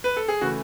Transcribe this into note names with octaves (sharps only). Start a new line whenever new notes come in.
B4
A4
G#4
C#3 E3 A3 F#4